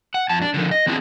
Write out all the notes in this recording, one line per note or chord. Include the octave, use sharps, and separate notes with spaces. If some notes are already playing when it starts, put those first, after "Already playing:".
F#5
F2 A5
D4
D3 D#3 F3
D#5
D#3 C4 D4 E4 G#4